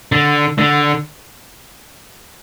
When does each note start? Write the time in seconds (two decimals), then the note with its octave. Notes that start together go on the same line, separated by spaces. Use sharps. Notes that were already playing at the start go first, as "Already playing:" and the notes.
0.12 D3
0.59 D3